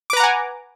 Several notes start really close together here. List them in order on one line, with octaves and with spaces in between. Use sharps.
D6 B4 A#5 F#5 G#5